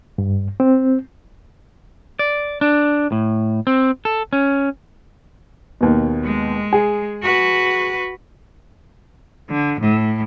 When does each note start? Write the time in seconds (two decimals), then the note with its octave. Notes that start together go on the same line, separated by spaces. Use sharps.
0.18 G2
0.60 C4
2.19 D5
2.61 D4
3.12 A2
3.67 C4
4.05 A4
4.33 C#4
5.81 D#2 B2
6.24 G#3
6.73 G#4
7.23 F#4 B4
9.50 D3
9.80 A2